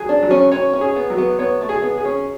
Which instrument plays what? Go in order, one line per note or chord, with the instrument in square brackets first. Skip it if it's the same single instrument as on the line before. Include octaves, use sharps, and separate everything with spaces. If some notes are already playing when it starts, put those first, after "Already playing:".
Already playing: [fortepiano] F#3 G#4
[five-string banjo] D4
[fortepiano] F#3
[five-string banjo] C#4
[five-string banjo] C#4 [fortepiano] C#5
[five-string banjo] C#4
[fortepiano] G#4
[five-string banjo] B3
[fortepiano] F#3
[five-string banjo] B3
[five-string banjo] B3 [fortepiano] C#5
[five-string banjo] A3
[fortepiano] G#4
[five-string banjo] B3
[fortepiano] G#4
[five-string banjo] C#4